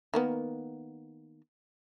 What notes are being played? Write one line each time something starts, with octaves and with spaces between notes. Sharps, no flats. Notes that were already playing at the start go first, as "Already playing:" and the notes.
D#3 A#3 B3